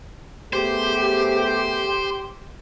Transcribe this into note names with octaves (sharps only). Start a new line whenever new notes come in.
A3 B3 G4 G#4 C5 G5